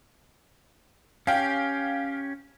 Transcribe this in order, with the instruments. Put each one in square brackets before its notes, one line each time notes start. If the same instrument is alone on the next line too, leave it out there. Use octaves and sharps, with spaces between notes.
[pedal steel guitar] C#4 G4 [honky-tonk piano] F5 G5